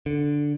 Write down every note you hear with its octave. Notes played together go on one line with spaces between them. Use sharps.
D3